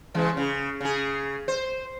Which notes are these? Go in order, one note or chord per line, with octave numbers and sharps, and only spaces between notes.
C#3 E3 G#3
C#3
C#3 G#4
C5